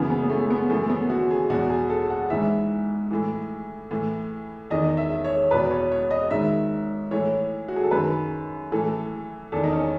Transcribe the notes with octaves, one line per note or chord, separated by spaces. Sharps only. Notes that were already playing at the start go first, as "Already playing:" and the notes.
Already playing: F#2 C#3 E3 B3
B3
B3
A3
B3
F#2 E3 A3
B3
F#4
G#4
E2 B2 F#4
G#4
A4
F#5
G#2 E3 E5
A2 E3
A2 E3
E2 D#3 D#5
E5
C#5
E2 B2 B4
C#5
C#5
D#5
G#2 D#3 E5
A2 E3 C#5
F#4
G#4
A4
F#2 D#3 B4
A2 E3 A4
E2 D#3 A4
D#4
C#4